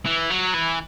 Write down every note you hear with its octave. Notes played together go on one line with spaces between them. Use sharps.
E3
F#3
E3